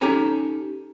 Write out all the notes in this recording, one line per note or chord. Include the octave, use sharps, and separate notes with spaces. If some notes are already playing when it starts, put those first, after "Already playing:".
C#4 D#4 G4 A4 G#5 A#5